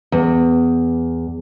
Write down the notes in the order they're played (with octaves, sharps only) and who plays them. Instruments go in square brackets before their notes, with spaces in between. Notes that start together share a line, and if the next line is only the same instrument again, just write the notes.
[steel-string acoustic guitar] E2